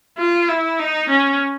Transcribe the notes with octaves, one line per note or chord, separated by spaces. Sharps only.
F4
E4
D#4
C#4